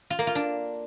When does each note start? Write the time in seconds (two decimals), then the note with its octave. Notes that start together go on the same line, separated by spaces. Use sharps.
0.10 F4
0.19 A#3
0.27 F4
0.35 D4